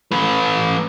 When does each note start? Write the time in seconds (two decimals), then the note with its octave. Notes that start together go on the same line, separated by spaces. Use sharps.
0.12 A3 B4